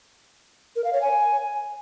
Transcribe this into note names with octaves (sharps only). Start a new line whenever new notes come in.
A#4
F5
C#5
G#5